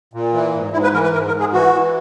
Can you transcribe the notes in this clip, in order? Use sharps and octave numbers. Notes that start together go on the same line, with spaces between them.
A#2
E3
G#2
G#2 E4
B4
E3 A#4
B4
G#2 A#4
A#4
G#2
G#4
E3 F#4
E3